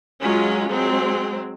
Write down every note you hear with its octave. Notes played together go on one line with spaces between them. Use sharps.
F#3 G#3 C#4 F4
F#3 G#3 C4